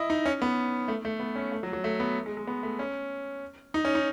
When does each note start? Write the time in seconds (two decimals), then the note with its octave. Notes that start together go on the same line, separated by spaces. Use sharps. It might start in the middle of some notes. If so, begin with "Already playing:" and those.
Already playing: E4 D#5
0.10 D#4
0.26 C#4
0.42 B3
0.88 A3
1.05 A3
1.20 B3
1.36 C#4
1.52 A3
1.63 F#3
1.73 F#3
1.84 A3
2.00 B3
2.26 G#3
2.37 G#3
2.47 B3
2.63 A3
2.79 C#4
3.74 D#4
3.85 C#4
3.95 D#4